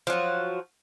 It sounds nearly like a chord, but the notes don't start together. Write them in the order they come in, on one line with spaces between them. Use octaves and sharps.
F3 F#3 F#4